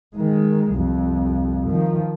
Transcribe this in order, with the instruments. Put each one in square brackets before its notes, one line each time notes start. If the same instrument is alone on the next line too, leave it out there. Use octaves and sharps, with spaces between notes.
[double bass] D#3 G#3
C2 F2
D#3 F3